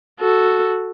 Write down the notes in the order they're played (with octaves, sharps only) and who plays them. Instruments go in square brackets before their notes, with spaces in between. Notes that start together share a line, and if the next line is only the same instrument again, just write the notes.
[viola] F#4 A4